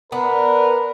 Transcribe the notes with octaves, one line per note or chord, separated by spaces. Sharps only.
B3 D4 A#4 B4